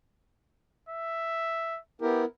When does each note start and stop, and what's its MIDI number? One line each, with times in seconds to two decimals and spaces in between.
0.89 1.80 76
2.01 2.25 59
2.01 2.25 64
2.01 2.22 67
2.01 2.25 70